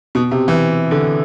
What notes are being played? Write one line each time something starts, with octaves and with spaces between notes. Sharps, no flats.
B2
C3
E3
D3